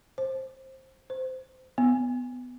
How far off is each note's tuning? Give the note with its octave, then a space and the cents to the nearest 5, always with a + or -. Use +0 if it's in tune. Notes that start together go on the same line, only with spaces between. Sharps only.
C5 +15
C5 -15
B3 +15